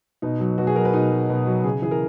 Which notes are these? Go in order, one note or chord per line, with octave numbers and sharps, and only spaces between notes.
B2 D#4
F#3
B2 F#4
G#4
F#3 A#4
B4
B2 D#4
F#3
B2
F#3
C#3 G#4
E3 G#4
A#4